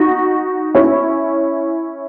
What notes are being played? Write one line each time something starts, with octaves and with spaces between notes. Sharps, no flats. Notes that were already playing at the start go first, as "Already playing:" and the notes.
Already playing: D#4 F#4
C#4 E4